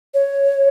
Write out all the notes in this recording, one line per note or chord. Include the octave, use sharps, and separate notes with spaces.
C#5